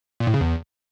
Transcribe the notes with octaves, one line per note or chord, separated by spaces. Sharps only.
A#2
A2
C#3
E2